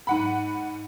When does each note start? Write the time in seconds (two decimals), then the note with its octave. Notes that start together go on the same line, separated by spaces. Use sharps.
0.07 G#2 F#5 B5